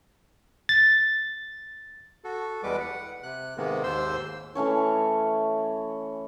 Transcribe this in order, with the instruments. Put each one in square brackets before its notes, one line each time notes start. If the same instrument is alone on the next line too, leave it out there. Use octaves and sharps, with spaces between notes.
[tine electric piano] A6
[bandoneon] F#4 A4
E2 G3 G#3 B4 D6
F#5
C3 F#6
G#2 C3 D#3 G#3 A#3 B3
D#2 G#2 C5 C6 E6
[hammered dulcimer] E3 A3 C#4 C#5